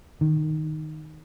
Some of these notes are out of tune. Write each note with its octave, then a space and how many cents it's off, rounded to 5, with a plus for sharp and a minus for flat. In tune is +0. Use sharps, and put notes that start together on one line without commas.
D#3 -5